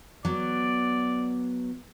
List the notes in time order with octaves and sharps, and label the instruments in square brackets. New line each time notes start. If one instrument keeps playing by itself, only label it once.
[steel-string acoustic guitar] F#3 B3 [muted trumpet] D5